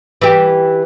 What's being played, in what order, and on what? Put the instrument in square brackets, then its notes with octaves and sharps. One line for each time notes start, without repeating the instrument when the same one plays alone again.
[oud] E3 G4